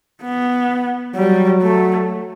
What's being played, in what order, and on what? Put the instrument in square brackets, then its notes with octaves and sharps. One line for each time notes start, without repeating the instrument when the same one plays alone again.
[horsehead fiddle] B3
[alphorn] F#3 [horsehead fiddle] G3
[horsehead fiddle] A3